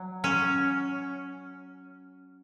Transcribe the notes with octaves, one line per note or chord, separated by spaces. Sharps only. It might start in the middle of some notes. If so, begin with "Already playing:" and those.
Already playing: F#3
C#4